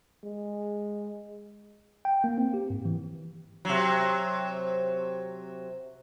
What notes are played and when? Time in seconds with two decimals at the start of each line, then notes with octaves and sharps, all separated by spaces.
0.24 G#3
2.05 G5
2.24 A#3
2.38 C4
2.54 G4
2.70 G#2
2.85 E3
3.65 C3 F#3